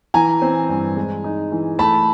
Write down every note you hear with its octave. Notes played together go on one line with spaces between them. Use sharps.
E3 G#5 A#5
C4
G2
G#3
D#4
E3
A3 A5 B5